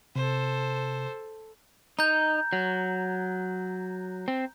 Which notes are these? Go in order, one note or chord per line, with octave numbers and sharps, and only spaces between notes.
C3 A4 C5
D#4 A#5 G6
F#3
C4